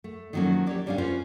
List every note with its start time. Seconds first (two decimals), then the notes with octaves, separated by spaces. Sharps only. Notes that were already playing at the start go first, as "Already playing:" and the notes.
0.04 A3
0.33 D#3 F3 F#3 A#3 C#4
0.67 G4 C#5 D5
0.86 G#2 G3 G#3 C#4 D4 F5
0.98 C#4 F4 B4 C5